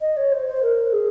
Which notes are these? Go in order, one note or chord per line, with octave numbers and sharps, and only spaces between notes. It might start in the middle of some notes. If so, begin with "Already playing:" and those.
D#5
C#5
C5
C5
A#4
G#4